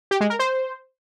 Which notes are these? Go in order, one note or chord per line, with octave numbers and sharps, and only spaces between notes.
G4
G#3
A#4
C5